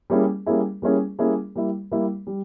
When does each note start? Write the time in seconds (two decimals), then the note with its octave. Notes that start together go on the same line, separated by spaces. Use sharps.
0.10 G3 A#3 C#4 E4 G#4
0.46 G3 A#3 C#4 E4 G#4
0.82 G3 A#3 C#4 E4 G#4
1.18 G3 A#3 C#4 E4 G#4
1.56 G3 A#3 E4
1.92 G3 A#3 E4
2.27 G3